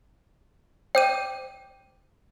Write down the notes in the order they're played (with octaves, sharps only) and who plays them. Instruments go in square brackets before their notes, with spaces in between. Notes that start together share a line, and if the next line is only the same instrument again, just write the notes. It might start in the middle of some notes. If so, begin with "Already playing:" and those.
[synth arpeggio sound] C5 D6 [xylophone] G5 G6 D#7